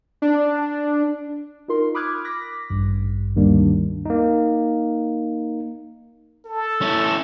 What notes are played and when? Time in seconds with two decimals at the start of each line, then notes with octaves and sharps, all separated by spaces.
0.22 D4
1.68 D#4 F4 A#4 C6
1.94 B5 D6 D#6 F6 F#6 G#6
2.24 D6 F#6 A#6 B6
2.70 A1 G2
3.36 D2 G2 D#3 G3 A#3 D4
4.05 A#3 D#4
6.45 A4
6.82 C#4 E4